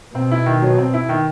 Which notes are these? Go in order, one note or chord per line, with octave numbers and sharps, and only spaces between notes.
B2 C4
E4
D#3
F#3
C4
E4
D#3